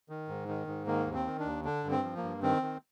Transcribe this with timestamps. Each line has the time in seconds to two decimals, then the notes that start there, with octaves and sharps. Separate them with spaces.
0.09 D#3
0.28 G#2
0.48 D#3
0.67 G#2
0.87 D#3 A#3
1.06 D#2
1.14 C4
1.26 D#3
1.39 D4
1.45 D#2
1.65 D3 D4
1.84 G2
1.91 C4
2.03 F3
2.17 A#3
2.23 G2
2.43 D#3 C4
2.62 D#3